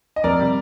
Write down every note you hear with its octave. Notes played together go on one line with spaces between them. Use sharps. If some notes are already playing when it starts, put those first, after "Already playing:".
D#5
F2 A#4 D5
C3 G3